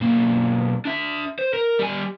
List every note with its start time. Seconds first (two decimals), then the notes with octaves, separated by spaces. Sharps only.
0.01 B1 A#3
0.85 D4 E5
1.39 C5
1.54 A#4
1.79 G3 G#5